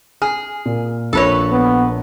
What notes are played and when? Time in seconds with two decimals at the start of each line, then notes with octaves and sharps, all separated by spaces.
0.22 G#4 F6
0.66 A#2
1.13 A#1 A#2 A4 B4 C#5 A#6
1.52 B3